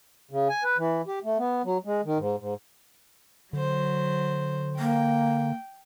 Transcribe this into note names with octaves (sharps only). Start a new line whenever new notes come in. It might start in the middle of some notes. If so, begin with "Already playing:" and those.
C#3
G#5
B4
E3
G4
A3
B3
F#3
G#3
D#3
G#2
G#2
D3 F#3 C5
A#3 G5